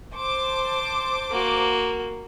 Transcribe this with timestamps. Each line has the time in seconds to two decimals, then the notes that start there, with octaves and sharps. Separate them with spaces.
0.13 C5 A5 D6
1.31 A#3 F#4